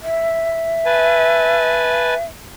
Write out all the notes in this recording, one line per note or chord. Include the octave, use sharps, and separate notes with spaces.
E5
B4 G#5 A5